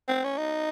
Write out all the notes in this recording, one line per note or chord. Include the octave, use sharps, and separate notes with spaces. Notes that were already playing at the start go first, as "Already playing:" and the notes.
C4
C#4
D#4